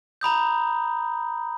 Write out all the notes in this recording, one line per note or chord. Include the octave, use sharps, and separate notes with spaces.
A#5 B5 D#6 G6